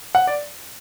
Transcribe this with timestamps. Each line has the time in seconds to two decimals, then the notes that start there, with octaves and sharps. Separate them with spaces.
0.15 F#5
0.27 D5